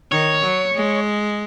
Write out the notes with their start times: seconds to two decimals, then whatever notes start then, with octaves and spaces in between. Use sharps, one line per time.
0.12 D#3 C#5
0.43 F#3
0.75 G#3